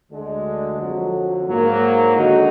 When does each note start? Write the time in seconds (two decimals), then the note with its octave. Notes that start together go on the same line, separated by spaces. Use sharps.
0.11 D2 D3 G#3 D4
0.79 F2 D3 F#3
1.48 G#2 F#3 A#3
2.16 D#2 D3 G#3 D#4 F#4